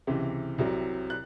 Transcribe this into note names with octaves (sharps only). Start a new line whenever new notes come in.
C#2 C3 E3
C2 C3 F#3
F#6